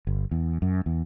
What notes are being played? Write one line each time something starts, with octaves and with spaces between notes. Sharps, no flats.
G1
E2
F#2
E2